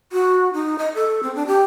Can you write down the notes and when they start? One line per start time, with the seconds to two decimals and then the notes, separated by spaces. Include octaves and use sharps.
0.12 F#4
0.53 D#4
0.79 D#5
0.95 A4
1.23 C4
1.35 D4
1.47 G4